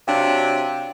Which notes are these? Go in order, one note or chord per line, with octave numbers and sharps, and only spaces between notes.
C3 F#3 D4 F5 G5